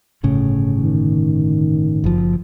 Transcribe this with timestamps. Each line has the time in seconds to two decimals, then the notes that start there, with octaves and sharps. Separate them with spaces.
0.23 G1 A2 C#3
0.79 D#3
2.04 F#1 F3